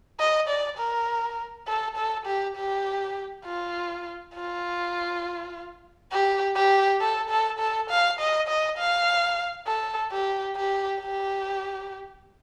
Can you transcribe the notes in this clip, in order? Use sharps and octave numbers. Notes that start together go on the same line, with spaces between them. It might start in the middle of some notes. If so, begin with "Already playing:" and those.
D#5
D5
A#4
A4
A4
G4
G4
F4
F4
G4
G4
A4
A4
A4
F5
D#5
D#5
F5
A4
G4
G4
G4